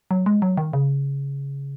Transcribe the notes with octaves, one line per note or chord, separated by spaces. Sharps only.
F#3
G#3
F#3
D#3
C#3